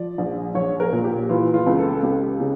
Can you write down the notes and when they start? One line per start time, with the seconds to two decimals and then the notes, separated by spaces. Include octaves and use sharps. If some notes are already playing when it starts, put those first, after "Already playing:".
Already playing: F3 D5
0.18 A#1
0.55 A#1 C#5
0.80 A#4
0.92 A#2
1.04 G4
1.29 E3 F4
1.54 F4
1.67 C#2
1.79 A4
2.03 C#2 G4
2.40 C#3